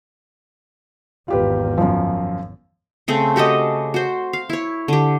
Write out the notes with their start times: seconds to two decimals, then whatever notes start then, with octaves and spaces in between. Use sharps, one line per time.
1.28 G#1 E2 F4 G4 B4
1.78 F#2 F3
3.08 C#3 A3 C4
3.36 F#4 G4 A4 D#5
3.94 F#4 C5
4.33 F5
4.49 E4 C#5
4.88 D3 G4